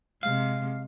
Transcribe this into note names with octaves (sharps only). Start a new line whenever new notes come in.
C3 G#3 F5